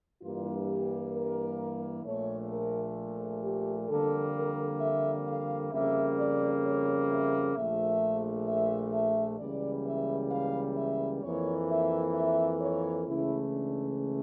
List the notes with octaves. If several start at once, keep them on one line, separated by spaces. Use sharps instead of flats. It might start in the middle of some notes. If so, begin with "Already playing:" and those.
G2 E3 A#3 F4
G4
A#4
A#1 A#2 A3 C#5
A#4
G4
F2 D3 G3 A#3 A4
A#4
E5
F5
F2 C#3 G3 A#3 E5
D5
C#5
E5
A#1 A#2 A3 E5
E5
E5
C#2 C#3 E3 G3 A#3 D5
E5
F5
E5
F2 E3 A#3 C#5
E5
E5
C#5
C#2 C#3 E3 A3 E4
D4